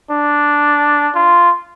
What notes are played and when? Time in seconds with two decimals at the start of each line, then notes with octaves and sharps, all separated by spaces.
0.11 D4
1.15 F4